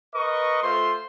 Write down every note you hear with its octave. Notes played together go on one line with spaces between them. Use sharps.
A#4 B4 D#5 C#6
A3 F4 C5 C6